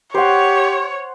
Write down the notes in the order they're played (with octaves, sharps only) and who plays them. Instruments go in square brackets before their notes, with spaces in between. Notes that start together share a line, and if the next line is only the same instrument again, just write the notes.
[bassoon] G4 [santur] C5 F#5 [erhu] C#5